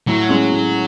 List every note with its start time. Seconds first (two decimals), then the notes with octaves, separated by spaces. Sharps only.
0.07 A2 F#3
0.29 G#3 C#4
0.51 A2